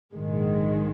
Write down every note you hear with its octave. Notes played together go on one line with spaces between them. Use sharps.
A#1 G#2 D#3 G#3